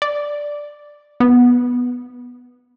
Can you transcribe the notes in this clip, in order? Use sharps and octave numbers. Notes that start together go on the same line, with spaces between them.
D5
B3